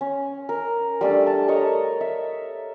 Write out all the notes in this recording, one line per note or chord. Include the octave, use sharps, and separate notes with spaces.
C#4
A#4
G3 A3 D4
A5
A4 A#4 C#5 D#5
E5